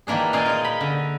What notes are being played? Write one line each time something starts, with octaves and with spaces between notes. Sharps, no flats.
D#3 E3 A#3 D4 G#4
A#2 D#4 G#4 D5 C6
A#4 D#5
B5
D3